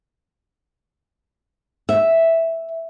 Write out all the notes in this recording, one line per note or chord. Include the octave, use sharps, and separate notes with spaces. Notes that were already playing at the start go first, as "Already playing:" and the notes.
E5